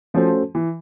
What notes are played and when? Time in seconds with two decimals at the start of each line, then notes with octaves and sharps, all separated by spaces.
0.14 F3 A3 C#4 F#4 A4 C5
0.55 E3